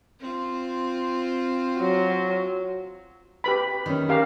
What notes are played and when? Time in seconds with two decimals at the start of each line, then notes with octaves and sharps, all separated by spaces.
0.20 C4 F4
1.78 F#3
3.44 G4 B4 B5
3.86 D#3 C#4
4.09 G4 A#4 F5